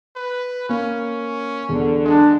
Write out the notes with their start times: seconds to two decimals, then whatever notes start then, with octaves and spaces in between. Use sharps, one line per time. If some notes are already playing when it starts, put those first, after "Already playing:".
0.16 B4
0.69 A#3 C#4
1.69 E2 D3
2.05 G#3 D4